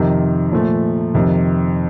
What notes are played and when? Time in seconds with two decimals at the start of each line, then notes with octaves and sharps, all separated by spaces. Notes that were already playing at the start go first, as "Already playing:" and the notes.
Already playing: F2 C3 D#3
0.52 A#2 F3 A3
1.14 F2 C3 D#3